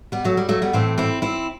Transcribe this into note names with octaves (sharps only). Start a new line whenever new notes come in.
G3 B3
F#3 A3
G3
F#3 A3
G3 B3
A2 E3 A3 C4
C4 E4
C4 E4